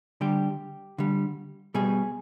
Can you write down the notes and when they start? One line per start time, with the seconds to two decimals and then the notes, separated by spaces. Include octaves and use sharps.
0.21 D3 G3 G4
0.98 D3 G3
1.74 B2 G3 G#4